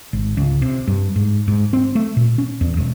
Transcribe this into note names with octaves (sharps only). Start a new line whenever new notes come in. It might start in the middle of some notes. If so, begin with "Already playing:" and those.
G#1
C#2
C3
G2
G#2
G#2
C4
A3
A#2
C#4
E2
E1